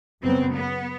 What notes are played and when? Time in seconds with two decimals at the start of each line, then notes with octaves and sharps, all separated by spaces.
0.23 F#2 C#3 F#3 B3 C4
0.54 B3